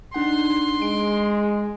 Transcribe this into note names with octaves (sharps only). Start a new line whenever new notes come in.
D4 D#4 F#5 C6
G#3 D7